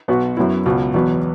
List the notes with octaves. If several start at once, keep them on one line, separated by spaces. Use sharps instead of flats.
B1 B2 B3 F#4
F#2 F#3 B3 E4
C#2 B2 B3 F#4
E2 B2 F#3 B3